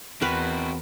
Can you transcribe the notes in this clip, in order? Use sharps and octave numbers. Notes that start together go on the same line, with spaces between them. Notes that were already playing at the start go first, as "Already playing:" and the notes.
E2 C4 F#4 A#4 B4